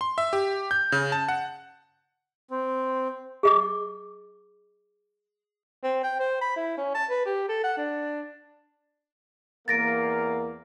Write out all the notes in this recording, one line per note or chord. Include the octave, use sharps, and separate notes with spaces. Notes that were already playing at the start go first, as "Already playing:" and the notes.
C6
E5
G4
G6
C#3
A5
F#5
C4
G#4 D#5 D6
C4
G5
C5
B5
E4
C#4
A5
B4
G4
A4
F#5
D4
E2 A#3 A6 A#6 D7